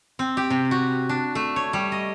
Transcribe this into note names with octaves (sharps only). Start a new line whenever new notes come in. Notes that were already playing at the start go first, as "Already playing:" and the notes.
C4
G4
C3
F#4
D4
A3
C#5
G3
D#5